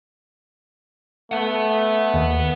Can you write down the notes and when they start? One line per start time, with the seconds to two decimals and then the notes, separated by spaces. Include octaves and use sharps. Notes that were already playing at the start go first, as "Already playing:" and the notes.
1.32 A3 B4 F#5
2.14 D#2